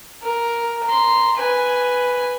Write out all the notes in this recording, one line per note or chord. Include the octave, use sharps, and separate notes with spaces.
A#4
A#5 C6
B4 G#5